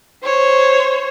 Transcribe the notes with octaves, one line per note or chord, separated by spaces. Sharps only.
C5 C#5